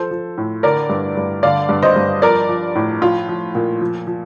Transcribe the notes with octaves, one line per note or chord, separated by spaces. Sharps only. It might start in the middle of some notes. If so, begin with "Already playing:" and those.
Already playing: F3 A4 C5
F3
A2
D3 A#4 D5
G2
G2
D3 D5 F5
G2
C5 D#5
G2
F3 A#4 D5
F3
A2
F3 F4
F3
A#2
F3
F3